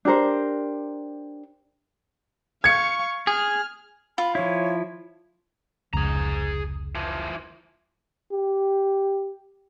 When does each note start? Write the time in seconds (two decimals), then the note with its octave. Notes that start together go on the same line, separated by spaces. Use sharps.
0.05 D4 G4 A#4 C5
2.64 F5 C#6 G#6 C#7
3.27 G#4 F6
4.18 F4 B5
4.35 F3 E4 C#5
5.93 F1 C#2 G#4 A#5
6.95 E3 F3
8.32 G4